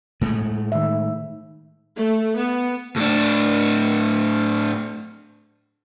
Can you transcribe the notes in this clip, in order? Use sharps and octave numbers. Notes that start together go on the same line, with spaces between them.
A2 G#3 A3
D#3 E5
A3
B3
A2 D4